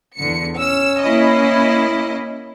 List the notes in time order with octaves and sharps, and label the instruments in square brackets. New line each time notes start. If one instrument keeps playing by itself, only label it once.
[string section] E2 D3 C#7
[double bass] C#4 [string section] E6
[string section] A#3 E4 D#5